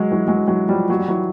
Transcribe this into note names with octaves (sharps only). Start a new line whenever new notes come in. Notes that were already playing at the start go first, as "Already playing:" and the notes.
Already playing: F#3 G#3
E3 F#3
F#3 G#3
E3 F#3
F3 G3
F#3
G3
E3 F#3